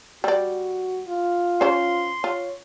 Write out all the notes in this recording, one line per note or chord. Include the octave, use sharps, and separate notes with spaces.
G3 F#4 D5
F4
C#4 C5 C6
F4 C#5